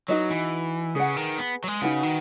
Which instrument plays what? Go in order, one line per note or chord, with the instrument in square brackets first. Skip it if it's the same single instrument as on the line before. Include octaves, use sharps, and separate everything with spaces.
[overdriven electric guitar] F#3 [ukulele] D#4 F#4 B4 D#5
[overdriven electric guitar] E3
[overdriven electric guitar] C#3 [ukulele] G#4 B4 F#5
[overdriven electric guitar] D#3
B3
F#3
G#3
[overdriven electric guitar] C#3 [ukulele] D#4 F#4 B4 F#5
[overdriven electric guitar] D#3